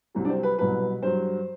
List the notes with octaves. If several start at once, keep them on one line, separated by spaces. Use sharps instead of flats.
C2 C3 F#3
D4
C4
B4
C2 B2 F#3 B4
G2 F#3 C5